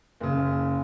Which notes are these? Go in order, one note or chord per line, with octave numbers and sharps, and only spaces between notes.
F#1 C#3